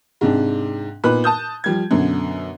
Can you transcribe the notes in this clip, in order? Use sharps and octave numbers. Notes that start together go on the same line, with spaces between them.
G#2 C3 D4
A#2 B3 D#4 B4 B5 F#6
A5 D#6 G6
F3 G3 G#6
F#2 B2 D3